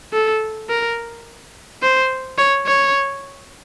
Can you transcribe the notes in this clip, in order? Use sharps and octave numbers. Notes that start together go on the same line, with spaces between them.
A4
A#4
C5
C#5
C#5